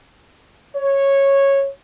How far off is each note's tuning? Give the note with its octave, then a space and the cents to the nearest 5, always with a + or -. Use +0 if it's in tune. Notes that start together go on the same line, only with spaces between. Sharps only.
C#5 -10